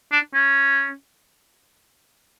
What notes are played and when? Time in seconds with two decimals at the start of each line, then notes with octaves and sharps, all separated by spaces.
0.12 D4
0.34 C#4